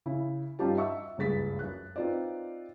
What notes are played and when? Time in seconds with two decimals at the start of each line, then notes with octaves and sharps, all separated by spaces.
0.06 C#3 E4
0.59 G2 C#4 D#4 F4 G4 A5
0.77 D#5 E5 F#5 C#6 E6
1.18 F#1 C#2 G2 G#4 A6 B6
1.59 F#2 F#6
1.96 C4 D#4 F4 B4 D5